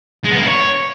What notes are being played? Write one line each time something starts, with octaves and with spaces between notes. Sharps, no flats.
G#3
B3
A#3
E4
C#5